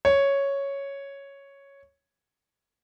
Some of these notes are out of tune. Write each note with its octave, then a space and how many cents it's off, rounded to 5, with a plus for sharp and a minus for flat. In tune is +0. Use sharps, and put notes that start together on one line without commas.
C#5 +0